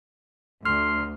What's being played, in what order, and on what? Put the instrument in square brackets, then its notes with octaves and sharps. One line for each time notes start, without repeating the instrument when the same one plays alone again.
[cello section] D2 [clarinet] C6 [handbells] F6